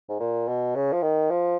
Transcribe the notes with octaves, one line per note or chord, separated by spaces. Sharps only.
G#2
A#2
B2
C#3
F3
D#3
F3